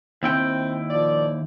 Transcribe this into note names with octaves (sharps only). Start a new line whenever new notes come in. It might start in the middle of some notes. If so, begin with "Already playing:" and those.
D#2 C4 E4 G5
A#2 F3 D5